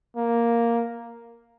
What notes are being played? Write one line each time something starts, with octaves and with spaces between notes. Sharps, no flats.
A#3